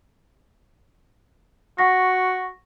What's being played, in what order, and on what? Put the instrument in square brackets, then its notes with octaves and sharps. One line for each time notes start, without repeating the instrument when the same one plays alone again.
[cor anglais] F#4 [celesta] F#5 C#6 A#6